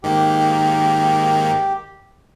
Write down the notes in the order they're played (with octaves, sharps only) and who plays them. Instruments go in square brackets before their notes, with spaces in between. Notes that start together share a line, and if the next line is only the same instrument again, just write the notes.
[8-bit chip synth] G#2 D#3 A#3 [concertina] G4